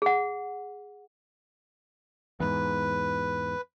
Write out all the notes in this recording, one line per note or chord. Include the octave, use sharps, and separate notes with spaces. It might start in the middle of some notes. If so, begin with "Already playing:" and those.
G#4 F#5
E2 G#2 B4